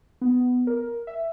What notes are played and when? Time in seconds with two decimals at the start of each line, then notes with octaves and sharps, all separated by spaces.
0.21 B3
0.67 A#4
1.07 E5